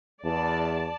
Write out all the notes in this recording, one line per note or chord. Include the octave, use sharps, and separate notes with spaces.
E2 D5 A5